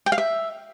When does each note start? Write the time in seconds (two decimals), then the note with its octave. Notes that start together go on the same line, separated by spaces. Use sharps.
0.06 G5
0.12 F5
0.18 E5